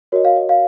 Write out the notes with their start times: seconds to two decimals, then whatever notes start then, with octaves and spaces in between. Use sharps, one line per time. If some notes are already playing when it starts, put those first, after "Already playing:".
0.12 F#4 A#4 C#5 D#5
0.25 F5
0.36 D#5
0.49 F5